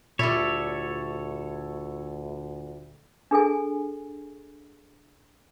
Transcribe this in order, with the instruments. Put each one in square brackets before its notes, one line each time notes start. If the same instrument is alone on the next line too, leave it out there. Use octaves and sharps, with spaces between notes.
[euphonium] D2 [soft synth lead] A#2 [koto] G3 E4 [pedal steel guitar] A4 C#5
[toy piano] D4 G#4 A4 G#5